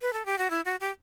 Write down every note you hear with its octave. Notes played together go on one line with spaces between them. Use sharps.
B4
A4
G4
F#4
E4
F#4
G4